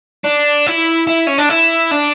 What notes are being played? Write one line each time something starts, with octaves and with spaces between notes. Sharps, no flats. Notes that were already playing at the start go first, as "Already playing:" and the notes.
D4
E4
E4
C#4
D4
E4
D4